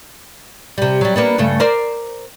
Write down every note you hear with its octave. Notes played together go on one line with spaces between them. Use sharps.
C3 G3
F#3 G3
A#3 B3 D4
G2 C#3 A3
A#4 C5 D5